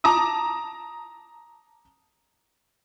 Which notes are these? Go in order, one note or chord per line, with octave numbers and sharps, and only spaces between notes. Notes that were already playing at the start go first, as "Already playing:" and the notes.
A5 A#5 D6 D#6